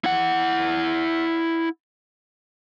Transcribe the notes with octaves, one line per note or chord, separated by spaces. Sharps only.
E4 F#5